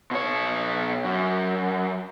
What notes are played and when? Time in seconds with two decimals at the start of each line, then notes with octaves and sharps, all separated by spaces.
0.11 B2 C#5
1.04 F#2